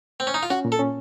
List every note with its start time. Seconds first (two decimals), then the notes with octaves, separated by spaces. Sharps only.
0.20 C4
0.27 C#4
0.34 D#4
0.43 F4
0.50 C#4 F#4
0.65 A#2
0.72 A4
0.79 C#4